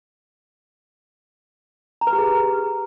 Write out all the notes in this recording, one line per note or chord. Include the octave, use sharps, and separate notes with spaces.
A#5
B4
G4
G#4
B4